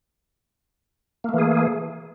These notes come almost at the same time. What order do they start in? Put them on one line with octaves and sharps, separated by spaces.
A#3 A3 E3 G#4